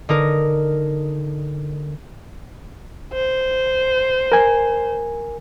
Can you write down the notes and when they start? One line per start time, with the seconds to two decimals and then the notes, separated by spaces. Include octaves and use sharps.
0.09 D3 D#4 A#4
3.14 C5
4.32 A#4 G#5